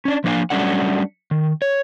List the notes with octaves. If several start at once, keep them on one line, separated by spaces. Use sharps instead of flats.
C#4 D4
F3 A#3 D4 D5 F5 G#5
F#3 G3 A3 C#4 D4 F#5
D#3
C#5